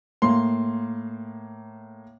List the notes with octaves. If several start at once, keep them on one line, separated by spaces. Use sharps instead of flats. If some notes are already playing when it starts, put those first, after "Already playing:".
A2 A#3 C6